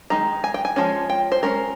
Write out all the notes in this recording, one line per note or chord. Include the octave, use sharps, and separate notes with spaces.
D#3 G#3 D#4 A#5
G#5
G5
G#5
F3 G#3 C#4
G5
C5
G#3 C#4 A#4